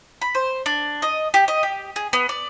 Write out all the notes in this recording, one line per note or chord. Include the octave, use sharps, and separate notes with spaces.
B5
C5
D4
D#5
G4
D#5
G4
G#4
B3
D5